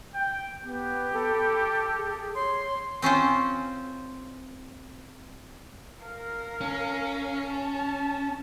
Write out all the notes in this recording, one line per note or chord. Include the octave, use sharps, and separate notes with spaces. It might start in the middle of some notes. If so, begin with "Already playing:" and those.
G5
B3 G4
A4 B5
G#4
C#5 C6
C4 C#4 F4 C5
A#4 F5
C#4
A5